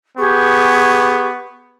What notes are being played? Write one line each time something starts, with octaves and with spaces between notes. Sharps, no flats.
B3 G4 G#4 C#6